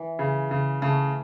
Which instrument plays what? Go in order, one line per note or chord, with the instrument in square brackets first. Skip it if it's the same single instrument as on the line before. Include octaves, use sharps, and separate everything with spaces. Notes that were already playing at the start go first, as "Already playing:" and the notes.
Already playing: [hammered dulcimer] E3
[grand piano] C#3
C#3
[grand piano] C#3 [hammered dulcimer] A3